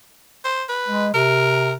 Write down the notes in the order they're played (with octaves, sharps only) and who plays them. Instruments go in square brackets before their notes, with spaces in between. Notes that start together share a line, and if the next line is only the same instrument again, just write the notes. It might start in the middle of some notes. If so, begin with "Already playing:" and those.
[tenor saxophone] C5
B4
[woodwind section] G#3
[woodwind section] C3 [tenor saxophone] A#4